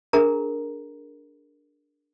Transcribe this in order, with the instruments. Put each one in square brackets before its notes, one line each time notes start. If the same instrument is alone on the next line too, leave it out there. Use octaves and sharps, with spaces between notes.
[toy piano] D4 G#4 A#4 A#5